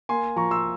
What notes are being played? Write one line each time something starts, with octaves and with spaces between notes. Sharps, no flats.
A#3 G#5 C6
F3 A#5 C#6
C6 E6